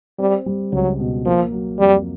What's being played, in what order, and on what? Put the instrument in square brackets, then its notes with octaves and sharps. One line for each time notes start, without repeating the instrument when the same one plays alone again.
[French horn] G3 [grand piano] C4
[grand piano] G3
[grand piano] C#2 [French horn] F#3
[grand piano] B2
[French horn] F3 [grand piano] A#3
[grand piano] F#3
[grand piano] F2 [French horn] G3